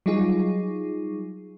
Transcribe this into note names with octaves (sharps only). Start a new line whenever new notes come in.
F#3 G3 D#4 F4 G#4